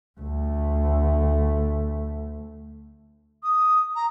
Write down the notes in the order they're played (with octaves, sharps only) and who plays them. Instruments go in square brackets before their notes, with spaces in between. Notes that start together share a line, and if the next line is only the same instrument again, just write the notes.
[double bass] D2 A3
[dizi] D#6
A#5